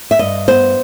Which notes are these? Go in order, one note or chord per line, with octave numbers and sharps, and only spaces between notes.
E5
G2 D#5
B3 C5